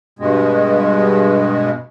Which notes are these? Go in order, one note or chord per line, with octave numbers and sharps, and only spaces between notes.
G2 B2 G#3